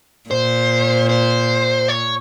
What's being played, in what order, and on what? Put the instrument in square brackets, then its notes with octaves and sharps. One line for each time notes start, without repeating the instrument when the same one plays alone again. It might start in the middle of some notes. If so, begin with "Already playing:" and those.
[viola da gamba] A#2 [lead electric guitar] C5
[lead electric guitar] C5
C#5